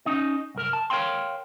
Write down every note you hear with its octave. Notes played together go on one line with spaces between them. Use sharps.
C#4 D#4 D#5
C2 F#2 A#4
A5
A#4 C#5 F5 G5 C6